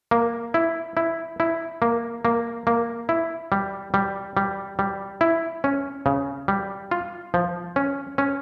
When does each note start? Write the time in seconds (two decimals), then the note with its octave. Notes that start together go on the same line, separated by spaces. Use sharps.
0.11 A#3
0.54 E4
0.97 E4
1.40 E4
1.82 A#3
2.25 A#3
2.67 A#3
3.09 E4
3.52 G3
3.94 G3
4.37 G3
4.79 G3
5.21 E4
5.64 C#4
6.06 C#3
6.48 G3
6.91 F4
7.34 F3
7.76 C#4
8.18 C#4